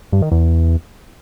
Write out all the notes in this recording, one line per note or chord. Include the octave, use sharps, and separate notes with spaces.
G2
D#3
E2